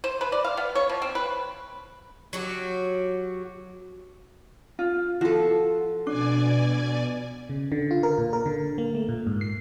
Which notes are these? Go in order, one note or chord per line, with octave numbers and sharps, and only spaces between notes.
C5
B4
D5
F5
B3
C#5
F3
C4
B4
F#3 F#4 G4
F4
F3 F#4 A4
B2 D4 D5 G#5
C#3
D3
F4
A#4
A#2
A#4
D3
A#3
A3
A#2
G#2
C7